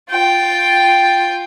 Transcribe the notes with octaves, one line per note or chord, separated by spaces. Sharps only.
F4 G5